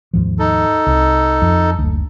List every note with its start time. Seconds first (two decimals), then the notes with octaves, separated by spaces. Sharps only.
0.14 D#2 G#2 F3
0.39 D#4 A4
0.87 C2
1.42 F2
1.79 F#1 D2